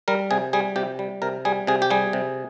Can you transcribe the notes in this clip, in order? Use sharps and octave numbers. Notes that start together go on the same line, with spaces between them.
G3 A#4
C3 G#4
G3 G#4
C3 G4
G3
C3 A#4
G3 G#4
C3 G#4
G4
G3 G#4
C3